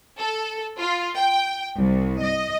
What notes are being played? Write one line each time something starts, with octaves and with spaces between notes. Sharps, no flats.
A4
F4
G5
C2
D#5